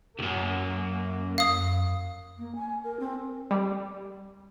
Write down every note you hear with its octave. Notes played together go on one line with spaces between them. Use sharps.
C#2 F#2 A#3
F#2 F5 D#6
A#3
G#5
A#4
C4
G3